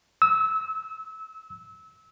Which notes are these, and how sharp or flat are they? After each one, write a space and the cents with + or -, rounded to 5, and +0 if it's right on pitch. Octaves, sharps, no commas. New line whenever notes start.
E6 -25